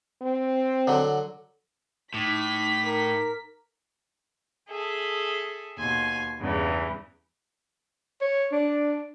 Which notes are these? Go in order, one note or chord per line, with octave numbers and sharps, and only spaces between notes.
C4
D3 F#3
A2 D#4 D6 B6
A#4
G#4 A4 E5
D#2 B2 G#5 C6
E2 G2 C#3 E3
C#5
D4